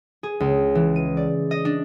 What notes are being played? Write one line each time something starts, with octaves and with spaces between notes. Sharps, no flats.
G#4
C#2
E3
D#7
D5
D#5
D4